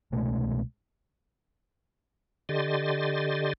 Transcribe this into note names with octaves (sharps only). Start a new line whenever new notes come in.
C2 B2 G#3 A3
D3 G4 D#5 C6 A6